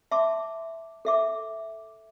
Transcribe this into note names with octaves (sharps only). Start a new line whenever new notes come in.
E5 A5 C6 D6
A4 E5 D6